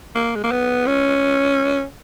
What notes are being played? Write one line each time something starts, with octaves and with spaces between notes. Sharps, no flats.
A#3
G#3
A#3
B3
C#4